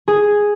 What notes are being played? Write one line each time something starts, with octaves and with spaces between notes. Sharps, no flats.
G#4